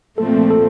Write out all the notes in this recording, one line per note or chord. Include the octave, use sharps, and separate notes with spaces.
A#2 F3 A3 C4 A4
A4